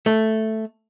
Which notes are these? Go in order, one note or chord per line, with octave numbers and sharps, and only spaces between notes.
A3